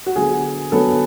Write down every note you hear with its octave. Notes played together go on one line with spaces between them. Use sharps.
F#4
D3 F#3 B3 G#4
D3 F#3 B3 A4